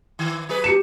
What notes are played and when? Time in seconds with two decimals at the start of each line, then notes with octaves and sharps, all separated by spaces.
0.19 D#3
0.49 F#3 G#4 B4
0.64 G4 C#7 E7